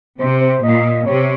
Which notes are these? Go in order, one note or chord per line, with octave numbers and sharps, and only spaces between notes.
C3 C5
C5
A#2 D#5
C3 C#5